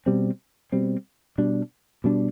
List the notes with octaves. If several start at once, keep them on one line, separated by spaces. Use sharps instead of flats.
B2 G3 C4
B2 G3 C4
B2 G3 D4
B2 G3 D4